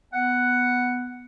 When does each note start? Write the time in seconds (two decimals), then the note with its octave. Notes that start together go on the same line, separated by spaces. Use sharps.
0.13 B3 F#5